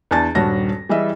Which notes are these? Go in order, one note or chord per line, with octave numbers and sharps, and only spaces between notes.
E2 D4 G#5 A5 A6
D#1 G2 F#4 C#5 A5 A#6
E3 G3 G#4 D#5 E5